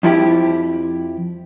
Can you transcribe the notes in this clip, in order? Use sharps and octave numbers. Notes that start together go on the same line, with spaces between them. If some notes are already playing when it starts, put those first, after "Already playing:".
F2 F3 E4 G4